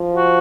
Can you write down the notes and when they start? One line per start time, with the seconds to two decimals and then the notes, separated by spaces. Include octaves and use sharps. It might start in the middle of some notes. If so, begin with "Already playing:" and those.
Already playing: F3
0.14 F#4